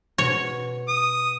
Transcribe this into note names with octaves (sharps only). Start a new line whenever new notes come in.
B2 C#5
D#6